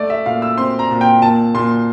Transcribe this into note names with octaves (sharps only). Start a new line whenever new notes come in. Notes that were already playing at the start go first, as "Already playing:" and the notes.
Already playing: A3 D5
E5
A#2 F5
E6
C4 C6
A#5
A#2
G5
A#2 A5
A#2 C6